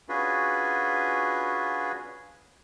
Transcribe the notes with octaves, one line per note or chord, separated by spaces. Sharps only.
C#4 D4 F4 F#4 G#4 B4